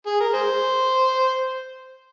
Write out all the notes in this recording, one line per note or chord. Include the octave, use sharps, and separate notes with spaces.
G#4
A#4
G#4 C5